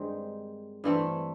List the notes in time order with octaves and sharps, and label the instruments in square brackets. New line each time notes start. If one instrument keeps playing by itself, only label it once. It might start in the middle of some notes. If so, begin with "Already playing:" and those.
Already playing: [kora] G2 D#3 G#3 C4
G2 E3 A3 C4